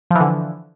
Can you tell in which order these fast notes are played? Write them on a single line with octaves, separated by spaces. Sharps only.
F3 E3 D3